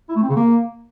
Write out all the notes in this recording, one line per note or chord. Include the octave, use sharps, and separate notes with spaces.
E4
A3
C4
C#3
A#3